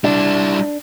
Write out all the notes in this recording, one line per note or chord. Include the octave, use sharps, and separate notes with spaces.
G3 D4 E4